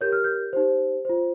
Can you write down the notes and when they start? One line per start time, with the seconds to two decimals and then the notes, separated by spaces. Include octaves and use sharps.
0.01 G4 A#4 C#5 G6
0.12 F6
0.24 G6
0.53 D#4 G4 C5
1.05 F4 C5